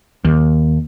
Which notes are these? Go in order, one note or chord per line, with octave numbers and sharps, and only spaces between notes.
D#2